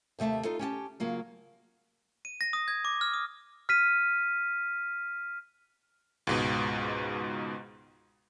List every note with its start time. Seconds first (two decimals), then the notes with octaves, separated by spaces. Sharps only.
0.19 D#2 C3 A3 E5 A5
0.44 D#4 F4 A4
0.59 C#4 G4 G5 A5
1.00 C#3 F#3 A#3 F4
2.25 D#7
2.41 A#6
2.53 D#6
2.68 G#6
2.85 D6
3.01 F6
3.14 D#6
3.69 F6 B6 D#7
6.27 C#2 G#2 B2